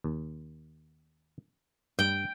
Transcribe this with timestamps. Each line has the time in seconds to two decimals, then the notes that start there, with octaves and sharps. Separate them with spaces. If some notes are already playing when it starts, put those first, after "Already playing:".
0.04 D#2
1.99 G2 G5